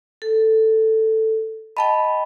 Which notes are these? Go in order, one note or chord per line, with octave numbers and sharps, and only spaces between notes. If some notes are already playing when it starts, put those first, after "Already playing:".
A4
D#5 G5 A5 B5